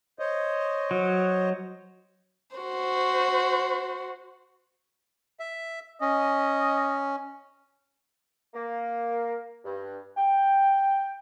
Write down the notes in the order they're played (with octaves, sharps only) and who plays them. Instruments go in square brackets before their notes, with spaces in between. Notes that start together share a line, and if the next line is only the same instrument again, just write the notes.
[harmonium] C5 C#5 D#5
[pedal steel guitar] F#3
[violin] F#4 C5
[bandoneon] E5
[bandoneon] C#4 [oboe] D#5
[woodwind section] A#3
G2
G5